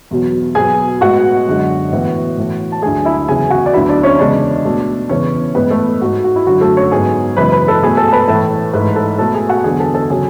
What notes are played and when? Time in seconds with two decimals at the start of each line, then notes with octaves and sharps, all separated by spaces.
0.11 E2 B2 F#3
0.55 B2 F#3 B3 G#4 G#5
1.01 A2 G#3 B3 F#4 F#5
1.47 F#2 D3 G#3
1.92 A2 E3 B3
2.37 A2 E3 A3
2.72 A5
2.82 D2 D3 F#3 A3 G#4 G#5
3.05 E4 E5
3.28 E2 C#3 F#3 G#4 G#5
3.50 F#4 F#5
3.66 D5
3.73 D2 D3 F#3 B3 E4 E5
3.89 D4 D5
4.03 C#4 C#5
4.19 E2 C#3 G#3 D4 D5
4.65 B2 A3
5.09 E2 C#3 E3 B3 C#4 C#5
5.55 A2 E3 G#3 B3 B4
5.70 A3 A4
6.01 G#2 G#3 B3 F#4
6.24 F#4
6.36 E4
6.46 F#2 D3 F#3 F#4
6.61 A3 A4
6.77 C#4 C#5
6.91 G#2 F#3 B3 G#4 G#5
7.37 F#2 C#3 E3 G#3 B3 B4 B5
7.52 B4 B5
7.68 A4 A5
7.82 B2 A3 G#4 G#5
7.97 A4 A5
8.08 A5
8.13 B4 B5
8.27 A2 E3 A3 A4 A5
8.74 G#2 E3 A3 B4 B5
8.96 A4 A5
9.18 B2 A3 A4 A5
9.34 G#4 G#5
9.49 F#4 F#5
9.64 E2 D3 F#3 B3 G#4 G#5
9.80 A4 A5
9.94 A4 A5
10.10 C#3 F#3 G#4 G#5